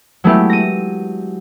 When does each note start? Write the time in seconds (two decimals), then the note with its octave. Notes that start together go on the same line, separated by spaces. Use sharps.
0.24 F#3 G#3 A3 B3 E4 G4
0.49 A#6 D#7